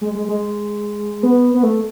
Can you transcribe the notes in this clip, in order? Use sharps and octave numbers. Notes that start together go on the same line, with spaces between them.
G#3
G#3
G#3
B3
B3
A3